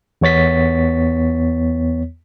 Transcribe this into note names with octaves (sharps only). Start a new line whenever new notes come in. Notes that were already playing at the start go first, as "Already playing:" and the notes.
E2 B3 C#5 A6 B6